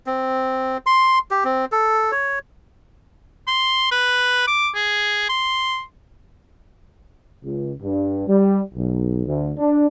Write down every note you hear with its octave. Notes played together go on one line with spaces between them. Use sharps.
C4
C6
G4
C4
A4
C#5
C6
B4
D6
G#4
C6
C#2
G2
G3
B1
D2
D4